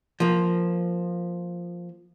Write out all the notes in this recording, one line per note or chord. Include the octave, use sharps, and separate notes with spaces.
F3 A#3